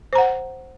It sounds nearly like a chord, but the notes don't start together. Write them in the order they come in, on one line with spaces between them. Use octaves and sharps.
C5 A#5 F#5